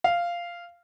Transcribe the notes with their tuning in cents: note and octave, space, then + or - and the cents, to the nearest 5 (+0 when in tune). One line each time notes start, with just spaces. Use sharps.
F5 -10